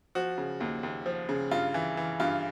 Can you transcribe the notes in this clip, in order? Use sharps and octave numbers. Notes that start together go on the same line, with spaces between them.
F3 F#4
C#3
D#2
D#2
F3
C#3
G2 F4
E3
E3
G2 F4